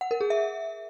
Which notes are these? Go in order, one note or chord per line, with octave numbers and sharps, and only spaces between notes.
F#5
A#4
G#4
E5